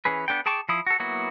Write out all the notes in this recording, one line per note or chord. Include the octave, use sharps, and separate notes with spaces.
E3 C#4 G#4 B4
B3 D4 A4 G5
G#4 G5 A5 C#6 D6
F3 E4 D#6
F#4 A4
F#3 A#3 B3 E4 F#4